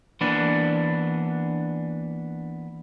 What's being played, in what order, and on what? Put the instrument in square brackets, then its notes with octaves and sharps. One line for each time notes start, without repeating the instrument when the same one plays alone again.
[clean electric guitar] E3 A#3 B3 D4